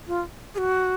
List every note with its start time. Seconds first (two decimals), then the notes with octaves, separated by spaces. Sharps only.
0.07 F4
0.55 G#4
0.58 F#4